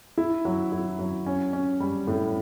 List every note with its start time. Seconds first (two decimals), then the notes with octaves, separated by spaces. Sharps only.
0.18 E4
0.45 F#3
0.72 E4
0.99 F#3
1.26 C#4
1.53 C#4
1.80 G3
2.07 A2